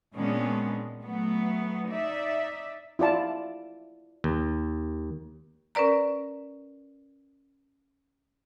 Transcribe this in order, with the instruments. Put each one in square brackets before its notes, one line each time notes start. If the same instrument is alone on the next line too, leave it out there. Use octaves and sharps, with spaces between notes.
[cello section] A#2 D#3 G#3 B3 C#4 D4
F#3 A3 B3
D#4 D5 E5
[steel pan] E4 F4 D5 A5
[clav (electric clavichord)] D#2
[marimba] C#4 A#4 B4 D5 A#5